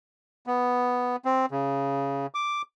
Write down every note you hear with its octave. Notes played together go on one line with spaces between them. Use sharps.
B3
C4
C#3
D6